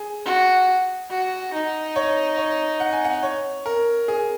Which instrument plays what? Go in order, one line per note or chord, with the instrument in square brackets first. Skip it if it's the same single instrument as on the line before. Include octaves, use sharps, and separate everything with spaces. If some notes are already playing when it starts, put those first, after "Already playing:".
Already playing: [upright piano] G#4
[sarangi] F#4
F#4
D#4
[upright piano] C#5
C#5
F#5
G#5
F#5
C#5
A#4
G#4